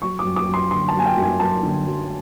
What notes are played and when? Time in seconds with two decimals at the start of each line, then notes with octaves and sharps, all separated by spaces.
0.02 F#3 C#6
0.19 D6
0.25 F#2
0.36 D6
0.48 F#2
0.54 C6
0.71 D3 C6
0.88 A5
0.95 F#3 G#5
1.05 G5
1.17 F#2
1.23 G#5
1.40 F#2 A5
1.63 D3
1.86 F#3